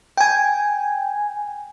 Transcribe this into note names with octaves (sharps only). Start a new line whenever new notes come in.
G5 G#5